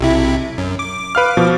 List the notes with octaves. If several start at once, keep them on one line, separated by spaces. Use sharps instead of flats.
B1 C3 E4
F#2
D6
B4 F5 F6
B2 F3